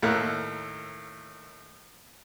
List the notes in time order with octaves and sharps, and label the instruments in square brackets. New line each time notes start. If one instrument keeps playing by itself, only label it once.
[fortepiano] D#2 A2 A#4 E5 F5 F#6